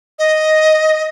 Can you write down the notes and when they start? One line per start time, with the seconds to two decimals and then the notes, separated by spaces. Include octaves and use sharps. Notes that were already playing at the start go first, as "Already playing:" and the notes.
0.19 D#5